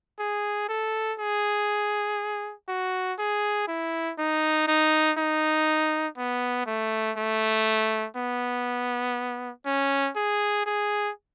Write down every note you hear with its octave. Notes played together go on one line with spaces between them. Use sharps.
G#4
A4
G#4
F#4
G#4
E4
D#4
D#4
D#4
B3
A3
A3
B3
C#4
G#4
G#4